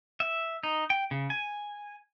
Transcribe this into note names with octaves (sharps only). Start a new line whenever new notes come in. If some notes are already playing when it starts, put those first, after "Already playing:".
E5
D#4
G5
C#3
G#5